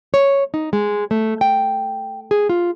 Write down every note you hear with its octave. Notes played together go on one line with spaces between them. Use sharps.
C#5
D#4
G#3
A3
G5
G#4
F4